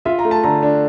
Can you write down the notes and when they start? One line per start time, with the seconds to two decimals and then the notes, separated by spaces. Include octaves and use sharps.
0.05 F4 E5
0.19 A#5
0.25 A3
0.31 A5
0.43 D3 A#5
0.63 D4